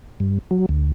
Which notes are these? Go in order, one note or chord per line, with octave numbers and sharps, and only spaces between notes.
G2
F#3
D2